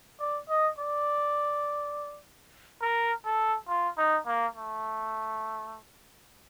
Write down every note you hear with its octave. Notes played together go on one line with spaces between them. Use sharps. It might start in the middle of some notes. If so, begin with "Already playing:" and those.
D5
D#5
D5
A#4
A4
F4
D#4
A#3
A3